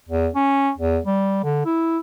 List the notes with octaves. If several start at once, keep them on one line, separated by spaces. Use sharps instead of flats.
E2
C#4
E2
G3
D3
E4